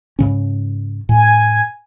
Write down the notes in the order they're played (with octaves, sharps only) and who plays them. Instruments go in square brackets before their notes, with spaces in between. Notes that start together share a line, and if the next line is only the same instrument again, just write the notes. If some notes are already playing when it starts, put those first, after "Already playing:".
[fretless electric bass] G#2 C#3 C#4
[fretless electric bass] A2 [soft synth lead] G#5